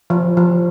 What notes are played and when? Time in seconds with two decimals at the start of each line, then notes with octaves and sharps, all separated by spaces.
0.10 F3
0.37 F3